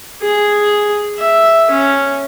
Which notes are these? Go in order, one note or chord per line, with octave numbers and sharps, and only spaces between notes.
G#4
E5
C#4